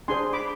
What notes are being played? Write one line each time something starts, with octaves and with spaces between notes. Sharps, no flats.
D4 G#4 C5 G#5 C6
B5 D6